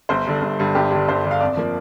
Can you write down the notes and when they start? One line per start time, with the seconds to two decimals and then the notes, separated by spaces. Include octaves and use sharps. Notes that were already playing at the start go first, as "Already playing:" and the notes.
0.09 G1 C5
0.26 G2 D3
0.42 G1
0.59 G2 D3
0.75 G1 G4
0.91 G2 D3
1.09 G1 C5
1.25 G2 D3
1.31 F5
1.41 F2 D5
1.57 F3 A#3